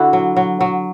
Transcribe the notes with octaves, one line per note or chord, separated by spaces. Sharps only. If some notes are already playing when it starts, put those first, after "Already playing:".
Already playing: D3 D4 E4 F#4
F#3
F#3
F#3